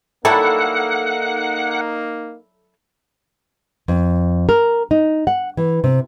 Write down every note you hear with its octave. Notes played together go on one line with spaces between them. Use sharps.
F#3 G3 A#3 D#4 E4 A4 F#5
F2
A#4
D#4
F#5
E3
C3